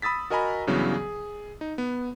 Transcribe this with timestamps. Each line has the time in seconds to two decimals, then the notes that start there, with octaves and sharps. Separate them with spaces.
0.02 B5 D#6 E6 A6 B6
0.30 F#4 A#4 D#5 G#5 A#5 B5
0.67 G2 C#3 E3 F#3 B3
0.93 G#4
1.61 D#4
1.78 B3